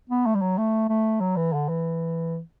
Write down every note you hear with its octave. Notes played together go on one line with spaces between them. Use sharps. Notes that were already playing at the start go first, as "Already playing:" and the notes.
B3
A3
G3
F#3
A3
A3
F#3
E3
D3
E3